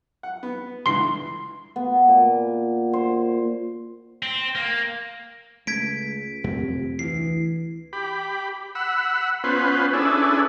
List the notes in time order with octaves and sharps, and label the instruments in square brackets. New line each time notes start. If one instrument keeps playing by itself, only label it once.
[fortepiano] F#5
B3
[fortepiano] C#2 D3 E3 [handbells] C6 C7
[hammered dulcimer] B3
A#2
C5
[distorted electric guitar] C4
A#3
[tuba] C#2 [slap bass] A3 [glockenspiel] G#6 B6 D7
[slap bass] F2 A3 [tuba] C3
[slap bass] D2 [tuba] E3 [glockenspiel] C7
[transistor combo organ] G4 B5
F#5 B5 E6
B3 C#4 F4 B4 C5
C#4 D4 E4 G#4 A4 B4